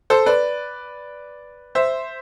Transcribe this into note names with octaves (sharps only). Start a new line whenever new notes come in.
A4 C5
B4 D5
C5 E5